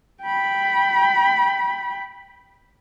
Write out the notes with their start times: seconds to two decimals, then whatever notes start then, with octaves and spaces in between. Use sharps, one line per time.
0.22 G5 B5